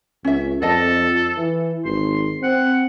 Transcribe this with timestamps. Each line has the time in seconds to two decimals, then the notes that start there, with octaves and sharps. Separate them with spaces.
0.25 C#2 C#4 E5
0.62 F2 A4 D5 D#5 A5
1.37 E3
1.85 G#1 C6
2.43 C4 F#5